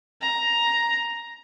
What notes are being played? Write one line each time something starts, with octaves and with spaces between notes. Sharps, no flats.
A#5